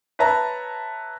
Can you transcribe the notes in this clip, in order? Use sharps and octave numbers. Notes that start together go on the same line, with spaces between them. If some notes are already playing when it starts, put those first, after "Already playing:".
B4 C#5 E5 A5 A#5